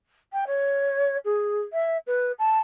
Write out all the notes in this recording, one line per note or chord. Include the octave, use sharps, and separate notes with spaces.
G5
C#5
G#4
E5
B4
A5